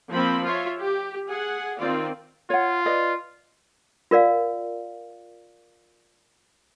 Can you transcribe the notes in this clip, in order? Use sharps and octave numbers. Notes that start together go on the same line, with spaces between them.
F3 A#3 C4 B5
F4 C#5 E5
G4
G#4 F#5
D#3 C4 F4 D5
F4 C#5 F#5
B4 D5 D#5
F4 A#4 D5 F5